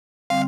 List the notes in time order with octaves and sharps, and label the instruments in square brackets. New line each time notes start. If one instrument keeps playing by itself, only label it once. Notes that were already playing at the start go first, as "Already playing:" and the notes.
[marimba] D3 G3 C4 [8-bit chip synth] F5